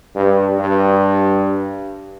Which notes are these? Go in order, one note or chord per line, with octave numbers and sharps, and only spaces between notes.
G2
G2